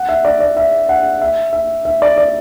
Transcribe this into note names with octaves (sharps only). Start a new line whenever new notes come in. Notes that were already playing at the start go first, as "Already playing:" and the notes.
Already playing: F#5
E5
D5
D5
E5
F#5
E5
E5
E5
D5
D5